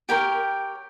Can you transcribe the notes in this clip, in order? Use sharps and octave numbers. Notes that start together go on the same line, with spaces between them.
G4 A#4 C#5 G5